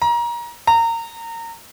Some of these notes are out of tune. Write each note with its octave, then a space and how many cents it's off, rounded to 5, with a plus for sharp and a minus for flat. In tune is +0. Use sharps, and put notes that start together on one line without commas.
A#5 +25
A#5 -25